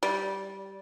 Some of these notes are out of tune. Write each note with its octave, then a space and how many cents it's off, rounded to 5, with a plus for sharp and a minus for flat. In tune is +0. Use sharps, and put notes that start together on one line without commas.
G3 -10